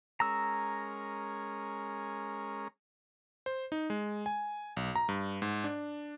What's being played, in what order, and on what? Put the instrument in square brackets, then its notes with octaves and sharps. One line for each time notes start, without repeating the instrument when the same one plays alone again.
[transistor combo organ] G#3 C#4 A#4 [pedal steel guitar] A#5 E6
[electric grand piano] C5
D#4
G#3
G#5
B1
A#5
G2
G#2
D4